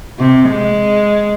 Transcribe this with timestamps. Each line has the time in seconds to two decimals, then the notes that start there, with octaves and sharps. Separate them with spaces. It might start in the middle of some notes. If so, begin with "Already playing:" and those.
0.19 C3
0.49 G#3